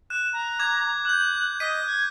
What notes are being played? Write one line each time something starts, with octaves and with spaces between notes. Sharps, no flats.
F#6 E7
A#5
D6 G#6
D6 F#6 G6
D#5 B6 D#7
G#6